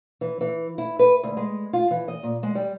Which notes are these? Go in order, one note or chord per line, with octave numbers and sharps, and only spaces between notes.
E3
E3
E4
B4
D2
G#3
F4
E3
D#5
A#2
G#3
G3